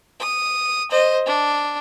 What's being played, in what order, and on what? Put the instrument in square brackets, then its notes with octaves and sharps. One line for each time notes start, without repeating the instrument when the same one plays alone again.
[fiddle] D#6
C5 D#5
D4